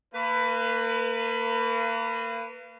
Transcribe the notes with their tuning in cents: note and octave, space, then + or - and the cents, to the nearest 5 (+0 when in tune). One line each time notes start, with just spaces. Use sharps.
A#3 -30 B4 +10